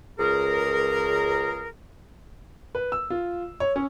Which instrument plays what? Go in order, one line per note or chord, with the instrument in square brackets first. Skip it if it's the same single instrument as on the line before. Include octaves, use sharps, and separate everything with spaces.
[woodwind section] C#2 G#4 A#4
[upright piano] B4
E6
F4
C#5
C#4